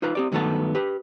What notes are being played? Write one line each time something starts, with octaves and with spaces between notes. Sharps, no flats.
D#4 F4 B4 A#5
C4 G4 D5
G2 D#3 F#3 A3 B3 A5
G4 B4